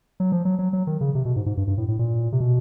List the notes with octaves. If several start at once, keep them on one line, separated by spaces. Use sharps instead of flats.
F#3
F3
F#3
F#3
F#3
D#3
C#3
C3
B2
G#2
G#2
G2
G2
A2
A2
A#2
C3
B2